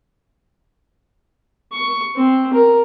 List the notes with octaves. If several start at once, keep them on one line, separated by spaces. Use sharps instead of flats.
C#6
C4
A#4